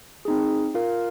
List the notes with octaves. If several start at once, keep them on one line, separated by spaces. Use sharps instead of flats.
C4 D#4 G#4
F4 A#4 F5